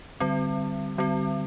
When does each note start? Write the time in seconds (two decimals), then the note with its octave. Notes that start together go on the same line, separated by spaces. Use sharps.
0.20 D3 G3 C4
0.98 D3 G3 C4